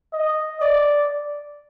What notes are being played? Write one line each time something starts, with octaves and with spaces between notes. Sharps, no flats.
D#5
D5